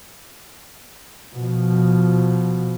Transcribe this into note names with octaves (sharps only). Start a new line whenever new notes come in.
B2 F3